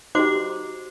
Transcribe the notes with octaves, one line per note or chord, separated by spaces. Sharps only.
D#4 F#4 G4 C5 D6